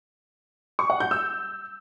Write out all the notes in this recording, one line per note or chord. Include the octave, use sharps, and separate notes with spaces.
C#6
F#5
G6
E6